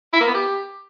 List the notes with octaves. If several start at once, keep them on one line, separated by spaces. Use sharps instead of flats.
E4
A#3
B3
G4